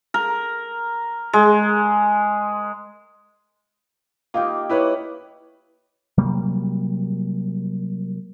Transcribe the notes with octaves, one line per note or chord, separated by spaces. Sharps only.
A#4
G#3
A#3 D#4 F4 G4
E4 B4 C#5
C3 F#3 G3 A#3